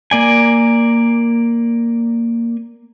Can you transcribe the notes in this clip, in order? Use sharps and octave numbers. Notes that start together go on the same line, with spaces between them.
A#3 D5 G#5